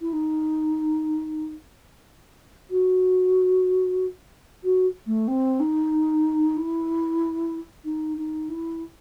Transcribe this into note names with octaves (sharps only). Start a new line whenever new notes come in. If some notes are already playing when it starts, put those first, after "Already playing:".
E4
D#4
F#4
F#4
A3
C4
D#4
E4
D#4
D#4
E4